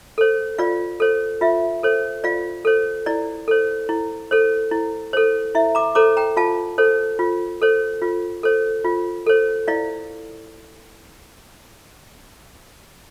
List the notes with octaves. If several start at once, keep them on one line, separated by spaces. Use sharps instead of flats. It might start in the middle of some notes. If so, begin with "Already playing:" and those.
A4 C5
F4 D5 F5
A4 C5
F4 E5
A4 C5
F4 D5 F5
A4 C5
E4 D5
A4 C5
E4
A4 C5
E4
A4 C5
E4 E5
A#5 D6
A4 C5 A#5 D6
G5 A#5
F4 F5 A5
A4 C5
F4
A4 C5
F4
A4 C5
F4
A4 C5
E4 D5 F5